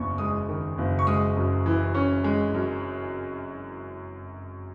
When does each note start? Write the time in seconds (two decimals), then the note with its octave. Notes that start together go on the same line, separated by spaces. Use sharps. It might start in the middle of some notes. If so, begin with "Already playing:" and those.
Already playing: F#1 E2 C#6
0.18 G#3 D#6
0.49 D#3
0.78 F#1
0.99 C#6
1.07 G#3 D#6
1.36 F#2
1.66 E3
1.94 C#4
2.24 G#3
2.54 F#2